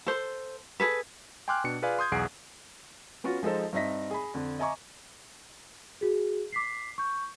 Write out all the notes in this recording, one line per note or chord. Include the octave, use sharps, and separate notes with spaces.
A4 C5
G#4 A4 B4
G5 G#5 C6 D6 F6 F#6
B2 D4 C#7
F4 G#4 B4 D5 F5 G#5
C6 D#6 G6 G#6
B1 E2 G#4 F#5 C7 D7
B3 C#4 F4 F#4
F3 G#3 D#4 A4 C5
G2 C4 D#4 E5 A#6 B6
G#4 B5
F2 D3
D#5 E5 G#5 A#5 C#6 D6
F#4 G#4
D6 B6 C7
C#6 G6